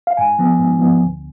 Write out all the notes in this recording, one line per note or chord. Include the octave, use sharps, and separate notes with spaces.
F5
G#2 G#5
F3 B3
G#2
F3 B3
D2